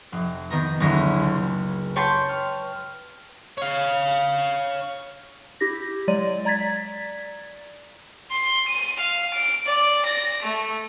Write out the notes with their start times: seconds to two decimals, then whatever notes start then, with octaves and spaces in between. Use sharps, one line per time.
0.12 F1
0.50 D#3 B3 A#5
0.80 F#1 D2 C#4 B5 G#6 A#6
1.20 C#2
1.96 B4 C#5 G5 A5 C6
2.29 F6
3.58 C#5 F5
5.60 E4 G4 A#6
6.08 F#3 G#3 D5 D#7
6.45 D5 A#5 G#6 A6 B6
8.32 C6
8.68 D#7
9.00 F5
9.34 D7
9.66 D5
10.06 A#6
10.42 A3